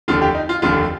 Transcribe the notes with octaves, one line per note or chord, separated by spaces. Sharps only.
F1 D#2 D3 F4
G4
D#4
F4
F1 D#2 D3 F4